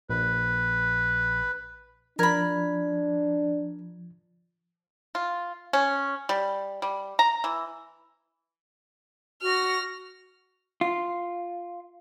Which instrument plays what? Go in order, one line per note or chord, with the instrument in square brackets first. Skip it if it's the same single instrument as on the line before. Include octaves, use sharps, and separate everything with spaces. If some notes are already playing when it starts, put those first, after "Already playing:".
[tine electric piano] A#1 [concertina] B4
[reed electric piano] F3 G#6 [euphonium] D4 [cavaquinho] A#4 B5
[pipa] F4
C#4
G3
G3
A#5
E3
[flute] F#4 [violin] F6 A#6
[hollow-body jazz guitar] F4